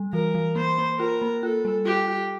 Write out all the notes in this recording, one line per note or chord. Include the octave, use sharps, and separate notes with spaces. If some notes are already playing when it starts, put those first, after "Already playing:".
Already playing: G3
E3 A#4
E3
A#3 C5
A#3
F4 A#4
A#3
F4 A4
G3
F4 G4
F4